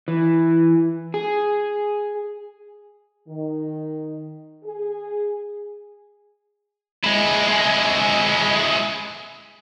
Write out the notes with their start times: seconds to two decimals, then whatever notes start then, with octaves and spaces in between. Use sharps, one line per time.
0.08 E3
1.14 G#4
3.29 D#3
4.64 G#4
7.04 G#3 E4